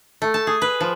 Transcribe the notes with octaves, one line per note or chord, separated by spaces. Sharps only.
A3
A5
G#4
B4
F3